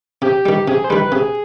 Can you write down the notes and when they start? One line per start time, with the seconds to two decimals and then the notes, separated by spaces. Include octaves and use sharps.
0.22 C3 G4
0.46 D#3 G3
0.68 C3 G#4
0.84 C5
0.90 D#3 G3 B4
1.12 C3 G#4